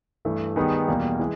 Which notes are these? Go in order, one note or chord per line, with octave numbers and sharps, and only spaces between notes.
G2 E3 A3
D#3 G3 B3 D#4 G#4
E2 B2 G3 A#3
E3 G#3